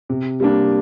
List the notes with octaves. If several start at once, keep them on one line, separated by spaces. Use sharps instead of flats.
C3
G3 A#3 D4